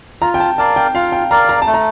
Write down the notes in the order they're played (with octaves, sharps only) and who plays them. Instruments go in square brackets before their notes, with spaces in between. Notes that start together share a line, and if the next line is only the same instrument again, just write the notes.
[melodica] F4 [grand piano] A#5
[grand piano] G5
A5
[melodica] A#4 D5 F5 [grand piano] A5
[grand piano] G5
[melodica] F4 [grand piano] F5
[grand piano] G5
[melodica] A#4 D5 F5 [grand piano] A#5
[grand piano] A#5
A5
[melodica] A3
[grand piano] A#5